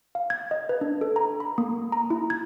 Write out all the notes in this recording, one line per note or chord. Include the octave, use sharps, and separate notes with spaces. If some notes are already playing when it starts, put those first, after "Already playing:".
F5
G#6
D#5
B4
D4
A4
A#5
B5
A#3
A#5
E4
G#6